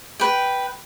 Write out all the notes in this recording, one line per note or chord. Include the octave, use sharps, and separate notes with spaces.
B4 G5